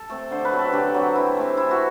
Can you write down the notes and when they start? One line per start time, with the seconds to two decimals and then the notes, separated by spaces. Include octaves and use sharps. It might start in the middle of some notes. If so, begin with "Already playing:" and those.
Already playing: A4
0.10 A3 C4
0.31 D3 C5
0.45 B4
0.52 F#3 C4
0.59 A4
0.73 D3 G4
0.94 F#3 C4
1.15 E3 E4
1.37 A3 C4
1.57 E3 E4
1.71 F#4